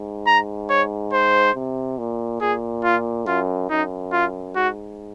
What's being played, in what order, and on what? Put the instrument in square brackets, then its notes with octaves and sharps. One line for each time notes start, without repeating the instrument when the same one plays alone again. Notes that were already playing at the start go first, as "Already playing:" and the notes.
Already playing: [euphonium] G#2
[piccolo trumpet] A#5
C#5
C5
[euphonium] C3
A#2
[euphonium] A#2 [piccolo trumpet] G#4
[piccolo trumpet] F4
[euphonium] F#2 [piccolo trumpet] F4
[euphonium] F#2 [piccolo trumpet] D#4
[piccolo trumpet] F4
[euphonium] G#2 [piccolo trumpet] F#4